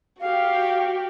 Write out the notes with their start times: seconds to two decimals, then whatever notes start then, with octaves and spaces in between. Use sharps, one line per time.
0.20 F#4 G4 F5